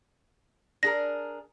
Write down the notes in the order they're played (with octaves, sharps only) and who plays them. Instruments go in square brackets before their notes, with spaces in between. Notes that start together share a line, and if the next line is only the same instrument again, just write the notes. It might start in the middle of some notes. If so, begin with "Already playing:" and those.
[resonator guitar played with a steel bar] D4 G#4 A#4 [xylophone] A#6